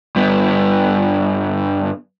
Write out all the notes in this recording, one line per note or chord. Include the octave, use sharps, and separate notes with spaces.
G2 B3